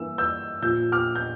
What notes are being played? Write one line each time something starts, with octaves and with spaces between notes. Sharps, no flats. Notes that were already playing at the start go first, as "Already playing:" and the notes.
Already playing: G2 E3 A#3 E6
E6 G6
A#2 F3 A#3 E6 G6
D6 F6
G6